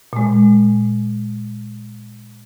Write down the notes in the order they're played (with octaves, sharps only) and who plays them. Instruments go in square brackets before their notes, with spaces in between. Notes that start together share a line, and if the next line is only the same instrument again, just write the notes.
[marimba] A#2 G#3